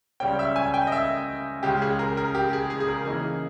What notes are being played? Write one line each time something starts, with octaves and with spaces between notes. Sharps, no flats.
C#2 C#3 G3 C#4 G5
E5
G#5
G5
D#5
E5
C#2 C#3 G#3 G4
G#4
A#4
A#4
G4
G#4
G#4
G#4
A#4
C#3 E3 A#3 D#4 G#4